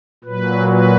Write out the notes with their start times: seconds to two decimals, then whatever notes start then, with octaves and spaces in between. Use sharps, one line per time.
0.24 A#2 F#3 B4
0.68 B4